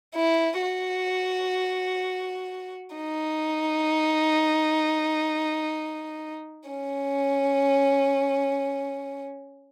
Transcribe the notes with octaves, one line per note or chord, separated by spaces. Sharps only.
E4
F#4
D#4
C#4